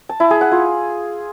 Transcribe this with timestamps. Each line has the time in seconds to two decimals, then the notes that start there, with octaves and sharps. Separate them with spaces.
0.09 A5
0.20 E4
0.31 G#4
0.41 F#5
0.52 F4